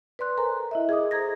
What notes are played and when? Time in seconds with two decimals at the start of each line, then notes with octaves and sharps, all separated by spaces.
0.19 B4 D5 C6 F#6
0.37 A4 A#4 C5 G#5 A#5
0.71 E4 D#5 E5
0.89 G#4 D#5 D6 D#6
1.11 A4 C5 A#5 G#6 A#6